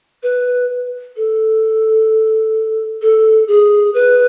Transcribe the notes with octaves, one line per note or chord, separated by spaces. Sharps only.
B4
A4
A4
G#4
B4